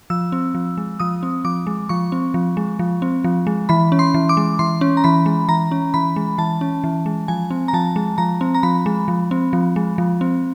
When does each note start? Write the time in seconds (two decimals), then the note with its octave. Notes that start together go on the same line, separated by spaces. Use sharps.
0.10 F3 E6
0.32 C4
0.54 F3
0.78 G#3
1.00 F3 D#6
1.23 C4
1.45 F3 D6
1.67 G#3
1.89 F3 C#6
2.12 C4
2.34 F3
2.57 G#3
2.79 F3
3.02 C4
3.24 F3
3.47 G#3
3.69 E3 B5
3.92 C#4
3.99 C6
4.14 E3
4.29 D6
4.37 G#3
4.59 E3 C6
4.81 C#4
4.97 A#5
5.04 E3 B5
5.26 G#3
5.49 E3 A#5
5.71 C#4
5.94 E3 B5
6.16 G#3
6.38 E3 A5
6.61 C#4
6.84 E3
7.06 G#3
7.28 F3 G#5
7.50 C4
7.68 A#5
7.73 F3 A5
7.96 G#3
8.18 F3 A#5
8.41 C4
8.55 A#5
8.63 F3 B5
8.86 G#3
9.08 F3
9.31 C4
9.53 F3
9.76 G#3
9.98 F3
10.21 C4